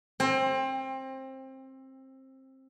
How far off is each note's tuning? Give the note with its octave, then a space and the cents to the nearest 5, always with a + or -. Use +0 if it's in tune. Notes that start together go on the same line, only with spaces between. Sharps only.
C4 +20 G5 +35